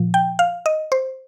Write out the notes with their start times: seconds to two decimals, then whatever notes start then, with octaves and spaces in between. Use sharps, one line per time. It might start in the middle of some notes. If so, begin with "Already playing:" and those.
Already playing: A#2 F3
0.14 G5
0.39 F5
0.66 D#5
0.92 C5